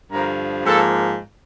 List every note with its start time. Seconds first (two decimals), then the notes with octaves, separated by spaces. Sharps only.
0.11 G2 D3 F3 A#4
0.65 G#2 F3 A#3 A4